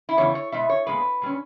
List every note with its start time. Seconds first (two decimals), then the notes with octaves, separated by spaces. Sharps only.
0.09 E4
0.17 E2 C#3 E3 G3 C#5
0.35 C#5
0.52 B2 G#3 B3 E5
0.69 C#5
0.87 A#2 G#3 B3 B4
1.22 A#2 G3 C#4